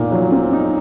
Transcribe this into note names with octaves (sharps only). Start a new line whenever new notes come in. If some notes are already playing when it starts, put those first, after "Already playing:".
Already playing: A#2 D#4
F#3
C4
D#4